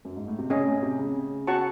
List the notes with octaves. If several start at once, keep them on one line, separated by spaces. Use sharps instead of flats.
F#2
G#2
A2
C3
C#3 C#4 G#4 D#5
A2
C3
C#3
F#4 C#5 F#5 A5 C#6